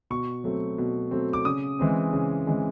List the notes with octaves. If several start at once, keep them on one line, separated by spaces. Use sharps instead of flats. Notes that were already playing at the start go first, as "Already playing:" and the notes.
B2 C#6
F#3 A3 C4
B2
F#3 A3 C4
D6
C#3 D#6
E3 G#3 C4
C#3
E3 G#3 C4